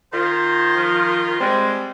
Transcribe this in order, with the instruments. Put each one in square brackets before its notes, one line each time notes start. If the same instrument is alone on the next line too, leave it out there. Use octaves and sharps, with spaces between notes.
[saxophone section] D#3 F4 [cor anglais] C5
[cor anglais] F3
[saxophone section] G3 C4 [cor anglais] G#3